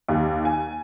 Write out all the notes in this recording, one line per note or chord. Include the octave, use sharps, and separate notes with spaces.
D#2
G#5